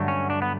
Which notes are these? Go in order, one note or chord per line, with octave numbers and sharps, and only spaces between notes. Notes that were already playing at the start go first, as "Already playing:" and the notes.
Already playing: G2 D3 F#3 A3
C#4
D4
B3